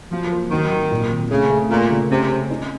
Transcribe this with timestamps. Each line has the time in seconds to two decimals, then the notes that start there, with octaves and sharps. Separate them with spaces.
0.11 F3 F#3
0.31 A#3
0.51 D#3 F#3
0.70 F#3
0.91 A#2
1.10 C4
1.30 C#3 A3
1.50 A3
1.70 A#2 A3
1.91 C#3
2.10 C3 C#4
2.29 C#4
2.50 D#4